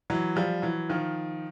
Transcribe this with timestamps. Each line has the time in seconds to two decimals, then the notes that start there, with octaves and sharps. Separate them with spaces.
0.10 E3 F#3
0.36 F3 G3
0.62 E3 F#3
0.90 D#3 F3